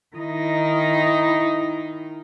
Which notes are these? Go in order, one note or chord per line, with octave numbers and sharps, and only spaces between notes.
D#3 D#4 E4